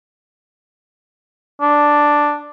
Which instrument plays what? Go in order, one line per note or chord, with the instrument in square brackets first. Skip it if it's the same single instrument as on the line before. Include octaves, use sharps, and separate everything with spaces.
[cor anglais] D4